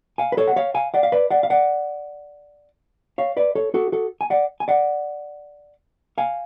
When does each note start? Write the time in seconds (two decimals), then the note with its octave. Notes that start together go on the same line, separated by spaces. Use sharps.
0.18 F5 G#5
0.32 B4
0.37 A4 C#5
0.48 F#5
0.56 C#5 F5
0.74 F5 G#5
0.94 D5 F#5
1.03 F5
1.12 B4 D5
1.31 D5 F#5
1.43 F5
1.50 D5 F#5
3.18 C#5 F5
3.37 B4 D5
3.55 A4 C#5
3.74 F#4 A4
3.92 F#4 A4
4.21 G#5
4.30 D5 F#5
4.60 G#5
4.68 D5 F#5
6.18 F5 G#5